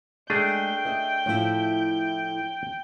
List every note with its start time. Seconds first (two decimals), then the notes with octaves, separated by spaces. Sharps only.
0.30 G#3 A3 D4 G#4 G5
0.85 D#5 E5
1.26 A2 F3 E4